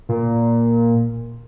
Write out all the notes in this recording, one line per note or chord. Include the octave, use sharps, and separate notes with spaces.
A#2